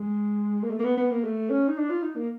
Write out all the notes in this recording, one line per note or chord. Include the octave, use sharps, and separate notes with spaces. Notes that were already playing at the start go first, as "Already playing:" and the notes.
Already playing: G#3
A#3
A3
A#3
B3
B3
A#3
A3
C#4
D#4
D4
F4
D#4
A#3